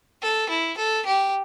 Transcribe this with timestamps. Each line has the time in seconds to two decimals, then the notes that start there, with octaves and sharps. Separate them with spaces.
0.22 A4
0.49 E4
0.77 A4
1.06 G4